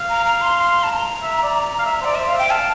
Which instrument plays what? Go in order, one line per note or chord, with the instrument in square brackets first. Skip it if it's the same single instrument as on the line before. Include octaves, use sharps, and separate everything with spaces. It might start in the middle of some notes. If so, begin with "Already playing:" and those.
Already playing: [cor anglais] F5
[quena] A#5
A#5
C6
C6
A5
A#5
[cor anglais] E5
D5
F5
E5
[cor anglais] C5 [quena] D5
[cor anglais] C5 [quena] E5
[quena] F5
[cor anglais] E5 [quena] G5
[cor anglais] F5 [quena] A5